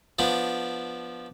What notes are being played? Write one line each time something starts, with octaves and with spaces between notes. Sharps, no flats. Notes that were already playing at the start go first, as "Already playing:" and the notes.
F3 B3 D4